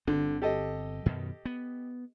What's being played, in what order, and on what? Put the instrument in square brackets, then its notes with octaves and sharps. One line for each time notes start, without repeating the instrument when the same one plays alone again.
[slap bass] G1 C4 [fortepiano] D3
[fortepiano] G4 A4 D#5
[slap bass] F#2 B2 D#3
B3